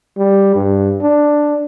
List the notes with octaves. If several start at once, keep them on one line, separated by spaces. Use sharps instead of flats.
G3
G2
D4